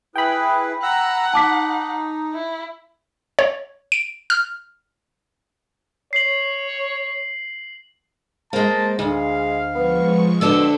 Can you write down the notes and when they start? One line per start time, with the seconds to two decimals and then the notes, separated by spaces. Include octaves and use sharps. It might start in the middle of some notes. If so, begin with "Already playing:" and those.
0.16 E4 G#4 B4 G5 B5
0.83 F#5 A#5 E6
1.33 D#4 A5 D6 B6
2.34 E4
3.39 C#5
3.92 D7
4.30 F6
6.13 C#5 C7 F#7
8.53 G#3 A#3 C5 A5
8.99 D2 G#3 F5
9.75 F3 G#3 B3 C#6
10.41 B2 D3 D4 A4 C5 E5 G5 E6